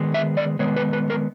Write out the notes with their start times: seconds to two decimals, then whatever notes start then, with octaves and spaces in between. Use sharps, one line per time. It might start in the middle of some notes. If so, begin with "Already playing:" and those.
Already playing: D#3 G#3 B3
0.14 E5
0.37 D5
0.59 D#3 G#3 B3 C#5
0.76 B4
0.93 B4
1.10 A#4